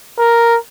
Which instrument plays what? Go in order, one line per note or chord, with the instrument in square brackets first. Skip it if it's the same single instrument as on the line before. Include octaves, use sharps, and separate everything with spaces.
[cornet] A#4